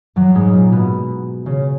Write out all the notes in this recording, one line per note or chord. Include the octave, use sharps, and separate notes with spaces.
F#2 F#3
G#2 G#3
A#2 A#3
B2 B3
C#3 C#4